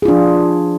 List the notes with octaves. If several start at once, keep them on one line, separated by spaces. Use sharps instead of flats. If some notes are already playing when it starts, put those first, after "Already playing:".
F3 D4 F4 G#4